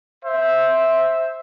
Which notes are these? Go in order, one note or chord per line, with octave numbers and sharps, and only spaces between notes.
C5 E5